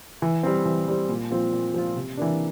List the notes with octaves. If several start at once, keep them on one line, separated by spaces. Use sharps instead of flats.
E3
G3 C4
E3
G3 C4
A#2
F3 C4 F4
A#2
F3 C4 F4
C3
E3 A#3 D4